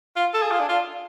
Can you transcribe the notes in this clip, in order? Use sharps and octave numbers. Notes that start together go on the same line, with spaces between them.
F4
A4
G#4
F4
D4
F4